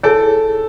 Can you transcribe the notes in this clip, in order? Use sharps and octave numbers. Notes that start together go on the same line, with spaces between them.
E4 G#4 A4 C#5 G#5